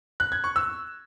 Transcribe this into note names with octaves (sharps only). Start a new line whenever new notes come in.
F#6
G#6
C#6
E6